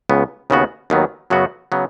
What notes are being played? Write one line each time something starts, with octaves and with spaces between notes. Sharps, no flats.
C#2 C#3 B3
D#2 C#3 B3 F#4
D#2 D#3 F#3 B3
F#2 C#3 F#3 B3 F#4
C#3 F#3 B3